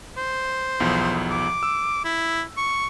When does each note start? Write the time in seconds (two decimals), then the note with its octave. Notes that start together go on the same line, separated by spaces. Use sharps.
0.17 C5
0.80 B1 E2 F3
1.31 D6
1.63 E6
2.05 E4
2.57 C#6